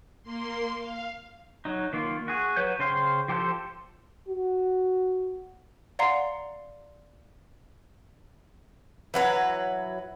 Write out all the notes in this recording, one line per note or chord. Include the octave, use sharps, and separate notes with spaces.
A#3 C6
F5
F#3 D#4
D#3 A#3 F4
F#4 G#4
F#3 F#4 B4 C#5 G6
C#3 C5 F5 G5
F3 G4 A4 C5 G6
F#4
D5 F5 F#5 A#5 C6 C7
E3 F#3 B4